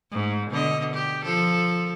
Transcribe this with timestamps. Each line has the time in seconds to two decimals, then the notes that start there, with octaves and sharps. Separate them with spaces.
0.12 G#2
0.51 B2 D3 D#5
0.93 G4
1.24 F3 A4